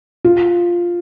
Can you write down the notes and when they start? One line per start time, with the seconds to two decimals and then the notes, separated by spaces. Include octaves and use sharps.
0.25 F4